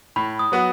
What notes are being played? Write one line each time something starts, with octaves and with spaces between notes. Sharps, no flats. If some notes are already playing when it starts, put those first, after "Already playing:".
A2 B5
D#6
F#3 B3 F#4